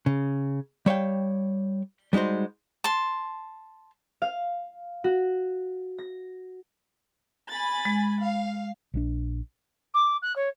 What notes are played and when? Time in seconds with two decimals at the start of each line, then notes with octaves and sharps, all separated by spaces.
0.06 C#3
0.86 G3 C#5 F5 G5
2.13 G3 G#3 D#4 F#4 C5
2.84 A5 C6
4.22 F5
5.04 F#4
5.99 A#6
7.50 G#5 B5 A6
7.85 G#3
8.20 F5
8.94 A#1 F3 D4
9.94 D6
10.22 F#6
10.35 C#5